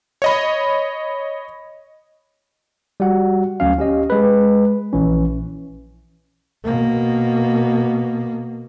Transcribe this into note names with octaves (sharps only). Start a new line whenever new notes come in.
C#5 D#5 B5
G3 F#4 F#5
D2 F#3 C#4 F5
C#4 G4 D#5
G#3 B4
A#1 E3 C#4
B2 A#3